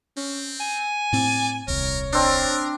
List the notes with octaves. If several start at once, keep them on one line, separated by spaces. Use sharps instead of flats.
C4 C#4
G#5
A2 C4 D5
D#1 C2 A#4 C#5
C4 D4 A#4